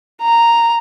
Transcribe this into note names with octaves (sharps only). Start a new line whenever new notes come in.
A#5